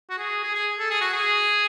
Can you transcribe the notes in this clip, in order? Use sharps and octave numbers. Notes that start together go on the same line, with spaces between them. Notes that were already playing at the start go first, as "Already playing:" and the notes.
F#4
G#4
G#4
G#4
A4
G#4
F#4
G#4